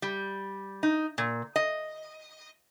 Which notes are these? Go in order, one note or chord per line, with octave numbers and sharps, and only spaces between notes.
G3
D#4
A#2
D#5